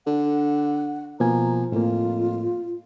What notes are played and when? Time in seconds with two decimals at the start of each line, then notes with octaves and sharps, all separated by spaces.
0.07 D3 F#5
1.20 B2 F3 A#3 G#5 A#5
1.72 F2 A2 A#3 F4